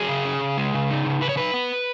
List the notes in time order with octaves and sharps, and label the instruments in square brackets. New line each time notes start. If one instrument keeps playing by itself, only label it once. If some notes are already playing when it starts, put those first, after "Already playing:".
Already playing: [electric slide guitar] F#3 G#4
C#3
C#4
C#3
G#3
C#3
D#4
C#3
C#3 B4
C#5
D#4 B4
B3